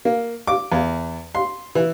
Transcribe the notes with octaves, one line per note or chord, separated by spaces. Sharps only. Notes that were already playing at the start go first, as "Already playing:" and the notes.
A#3
D6
E2
C6
E3